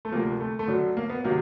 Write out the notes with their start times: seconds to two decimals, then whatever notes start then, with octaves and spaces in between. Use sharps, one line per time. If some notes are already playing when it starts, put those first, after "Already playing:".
0.05 A3
0.12 D2 C3 F3 A#3
0.40 A3
0.59 A3
0.68 F#2 D3 F#3
0.97 A#3
1.10 B3
1.24 C3 D#3 F#3 A#3